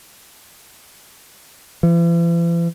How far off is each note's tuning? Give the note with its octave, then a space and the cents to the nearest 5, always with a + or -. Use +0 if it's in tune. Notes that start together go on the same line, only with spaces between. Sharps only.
E3 +45